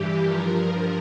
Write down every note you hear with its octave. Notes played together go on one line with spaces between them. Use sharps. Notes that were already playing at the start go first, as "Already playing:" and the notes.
Already playing: G2 E3 G4
G2 F3 A#4